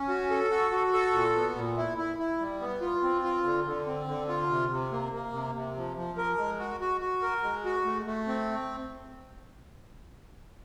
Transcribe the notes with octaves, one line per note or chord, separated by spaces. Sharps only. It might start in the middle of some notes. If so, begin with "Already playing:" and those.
Already playing: C#4
F#4
A4
F#4
F#4
A4
A#2
B3
A#2
E4
E4
E4
G3
B3
F4
C4
F4
D3
D3
C4
D3
F4
C3
C3
A#3
A#3
C3
C3
F3
F3
A#4
G#3
F#4
F#4
F#4
A#4
G#3
F#4
A3
A3
C4